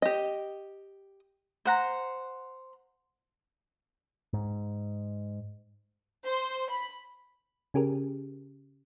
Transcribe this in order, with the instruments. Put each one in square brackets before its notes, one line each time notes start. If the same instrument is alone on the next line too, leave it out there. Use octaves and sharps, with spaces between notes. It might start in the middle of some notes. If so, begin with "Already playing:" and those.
[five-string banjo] G4 D#5
[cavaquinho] C5 F#5 A#5
[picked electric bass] G#2
[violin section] C5
B5
[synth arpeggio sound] C#3 C#4 G4 G#4 A#4